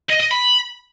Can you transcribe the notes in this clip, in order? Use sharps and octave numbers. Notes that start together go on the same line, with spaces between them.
D#5
D#5
B5